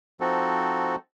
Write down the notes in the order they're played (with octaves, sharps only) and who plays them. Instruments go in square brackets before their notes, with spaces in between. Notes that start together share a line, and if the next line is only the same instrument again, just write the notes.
[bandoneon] F3 C4 D#4 F#4 A4